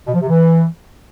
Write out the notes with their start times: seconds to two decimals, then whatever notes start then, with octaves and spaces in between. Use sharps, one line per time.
0.06 B2
0.14 F3
0.21 C3
0.29 E3